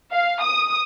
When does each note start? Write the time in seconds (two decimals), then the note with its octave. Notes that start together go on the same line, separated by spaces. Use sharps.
0.12 F5
0.42 D#6